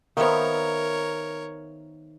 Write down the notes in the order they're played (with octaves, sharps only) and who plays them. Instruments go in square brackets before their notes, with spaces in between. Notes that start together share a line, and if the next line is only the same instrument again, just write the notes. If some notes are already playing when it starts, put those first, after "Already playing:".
[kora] D#3 B3 [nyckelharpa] A#4 C#5 [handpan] C5 E5 F5